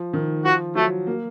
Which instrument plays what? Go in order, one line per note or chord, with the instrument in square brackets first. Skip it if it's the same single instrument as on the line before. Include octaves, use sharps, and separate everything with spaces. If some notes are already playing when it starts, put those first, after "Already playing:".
Already playing: [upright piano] F3
D#3
[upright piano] F3 [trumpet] F#4
[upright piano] F#3 [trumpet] A3
[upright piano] A#3